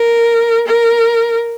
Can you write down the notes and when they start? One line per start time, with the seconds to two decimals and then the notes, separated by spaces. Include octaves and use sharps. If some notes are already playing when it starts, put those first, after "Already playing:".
Already playing: A#4
0.67 A#4